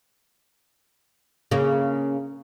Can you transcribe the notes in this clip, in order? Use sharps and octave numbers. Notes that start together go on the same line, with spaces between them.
C#3 A#3